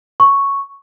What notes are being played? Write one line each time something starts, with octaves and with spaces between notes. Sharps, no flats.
C#6